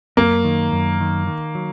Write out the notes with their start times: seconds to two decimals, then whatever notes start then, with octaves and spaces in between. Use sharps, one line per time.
0.17 F#2 A#3
0.44 D#3
0.72 F#2
1.00 D#3
1.27 D#3
1.55 F#3